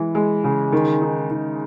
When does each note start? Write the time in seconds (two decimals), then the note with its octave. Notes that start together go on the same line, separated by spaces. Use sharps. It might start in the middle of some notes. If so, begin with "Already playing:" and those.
Already playing: E3 G#3
0.15 G#3
0.44 C#3
0.72 D#3
1.01 D#4
1.30 D#3